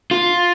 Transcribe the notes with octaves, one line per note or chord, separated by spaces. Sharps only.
F4